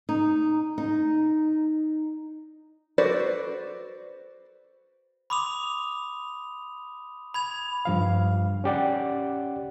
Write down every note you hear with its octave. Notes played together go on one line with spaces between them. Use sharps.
D#4
D#4
F#4 A4 B4 C5 D5
B5 C6 D6 D#6 F7
B5 G#6 F7
G2 F3 F5
C#4 G4 D5 F#5